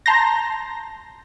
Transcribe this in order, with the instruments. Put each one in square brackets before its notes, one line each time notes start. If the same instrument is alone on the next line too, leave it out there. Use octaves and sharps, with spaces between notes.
[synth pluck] A5 A#5 C6 G6 A#6